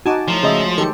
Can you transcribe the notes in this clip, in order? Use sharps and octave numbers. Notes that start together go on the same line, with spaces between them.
D#4 F#4 G#5 A5 D6
A2 F3 F#3 C#6
C#3 G#3 C5 D#5 E5
D#3 G4 A4 C#7